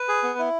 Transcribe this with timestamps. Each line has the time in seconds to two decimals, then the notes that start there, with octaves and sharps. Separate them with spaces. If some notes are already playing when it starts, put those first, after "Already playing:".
Already playing: B4
0.09 G#4
0.23 B3
0.39 E4